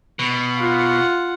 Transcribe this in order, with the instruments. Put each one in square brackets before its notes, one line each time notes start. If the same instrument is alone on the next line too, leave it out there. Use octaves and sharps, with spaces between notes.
[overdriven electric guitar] B2
[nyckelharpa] F4 F#5